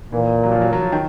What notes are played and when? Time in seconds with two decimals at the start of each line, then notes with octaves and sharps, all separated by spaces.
0.12 A#2 E3
0.44 F#3
0.52 F3
0.62 F#3
0.73 F#3
0.82 F3
0.92 D#3